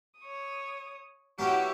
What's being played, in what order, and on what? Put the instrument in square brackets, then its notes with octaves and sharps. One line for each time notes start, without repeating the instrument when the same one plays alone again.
[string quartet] C#5 D#6
[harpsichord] F#3 B3 C#4 [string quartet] E4 F#4 G4